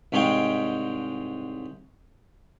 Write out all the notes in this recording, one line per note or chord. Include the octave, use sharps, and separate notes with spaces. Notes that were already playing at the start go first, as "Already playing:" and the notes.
C2 G#2 G#3 C#5 F5 G5